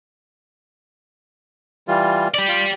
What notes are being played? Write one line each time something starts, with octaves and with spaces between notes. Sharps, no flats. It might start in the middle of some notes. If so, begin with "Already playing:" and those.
E3 G3 F4
G4 D5
F4